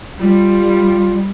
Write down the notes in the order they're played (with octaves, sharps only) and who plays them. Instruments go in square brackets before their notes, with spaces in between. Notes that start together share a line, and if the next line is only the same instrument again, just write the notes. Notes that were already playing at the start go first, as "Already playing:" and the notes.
[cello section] G3 [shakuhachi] F4